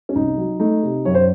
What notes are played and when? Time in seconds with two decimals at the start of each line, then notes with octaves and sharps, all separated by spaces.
0.09 C#4
0.15 C2 D#4
0.38 F#3
0.60 A3 D#4
0.83 C3
1.05 F#2 C#5
1.15 C5